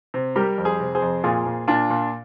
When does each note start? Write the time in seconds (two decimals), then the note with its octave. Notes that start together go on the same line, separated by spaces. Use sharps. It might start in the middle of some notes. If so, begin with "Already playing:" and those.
0.14 C3
0.36 G3 G4 A#4
0.58 F2
0.65 G#4 C5
0.80 C3
0.95 G#4 C5
1.02 F2
1.24 A#2 F4 G#4
1.46 A#2
1.68 A#2 D4 F4
1.90 A#2